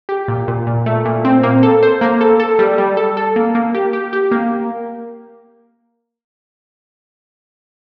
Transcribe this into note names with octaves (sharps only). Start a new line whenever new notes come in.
G4
A#2
A#2
A#2
A3
A#2
C4
A#3
A4
C5
A#3
A4
A4
G3
G3
A4
A4
A#3
A#3
G4
G4
G4
A#3